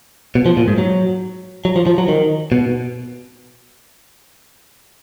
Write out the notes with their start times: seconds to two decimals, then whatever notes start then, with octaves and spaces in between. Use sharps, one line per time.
0.35 B2
0.46 F3
0.57 A#2
0.68 G#2
0.78 F#3
1.65 F#3
1.76 F3
1.87 F3
1.98 F#3
2.08 D#3
2.52 B2